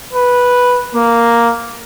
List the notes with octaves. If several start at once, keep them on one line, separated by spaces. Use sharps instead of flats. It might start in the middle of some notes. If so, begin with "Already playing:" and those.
B4
A#3